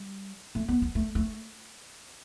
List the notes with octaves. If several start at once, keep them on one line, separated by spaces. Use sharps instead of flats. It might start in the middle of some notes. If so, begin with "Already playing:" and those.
Already playing: G3
A3
B3
B3
A3
A3